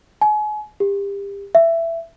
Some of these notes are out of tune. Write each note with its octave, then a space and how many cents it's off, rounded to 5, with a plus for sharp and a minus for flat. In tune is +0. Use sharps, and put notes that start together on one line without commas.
G#5 +35
G4 +30
E5 +15